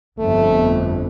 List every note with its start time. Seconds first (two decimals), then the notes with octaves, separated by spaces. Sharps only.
0.19 G1 F2 A3